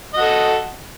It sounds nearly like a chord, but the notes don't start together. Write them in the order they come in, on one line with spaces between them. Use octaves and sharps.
D#5 F#4 A4